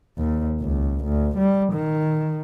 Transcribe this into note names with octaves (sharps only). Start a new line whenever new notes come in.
D#2
C#2
D2
G3
D#3